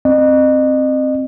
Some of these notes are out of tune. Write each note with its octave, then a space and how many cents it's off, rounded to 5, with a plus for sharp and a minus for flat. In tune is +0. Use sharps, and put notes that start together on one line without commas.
C4 +10 D#5 -35